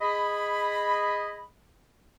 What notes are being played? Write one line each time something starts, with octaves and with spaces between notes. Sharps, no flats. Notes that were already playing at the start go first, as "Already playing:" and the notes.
G#4 D#5 B5